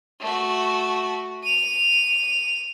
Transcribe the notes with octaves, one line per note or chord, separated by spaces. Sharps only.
A3 F#4
D#7 F7